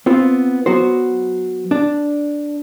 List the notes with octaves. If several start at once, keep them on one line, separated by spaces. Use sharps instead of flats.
B3 C4 F4
F#3 B3 F#4 C5
D4